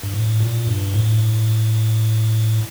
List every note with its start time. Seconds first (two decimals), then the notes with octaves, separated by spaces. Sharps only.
0.03 G2
0.14 A2
0.41 A#2
0.67 G2
0.94 A2